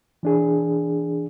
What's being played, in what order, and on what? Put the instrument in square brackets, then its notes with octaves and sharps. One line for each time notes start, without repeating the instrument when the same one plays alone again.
[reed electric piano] E3 D4 G#4